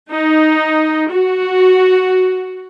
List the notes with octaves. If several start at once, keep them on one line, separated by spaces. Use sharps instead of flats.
D#4
F#4